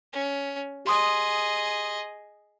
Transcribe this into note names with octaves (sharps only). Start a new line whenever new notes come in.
C#4
G4 G#4 D#5 C6 D#6